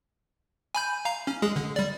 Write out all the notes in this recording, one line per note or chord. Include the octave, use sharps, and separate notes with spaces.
G#5 B5 G6
F5 A#5
C#4
G#3 G#4
D3
G3 D5